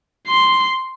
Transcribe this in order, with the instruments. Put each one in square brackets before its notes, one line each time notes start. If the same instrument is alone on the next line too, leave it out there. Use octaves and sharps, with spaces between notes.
[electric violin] C6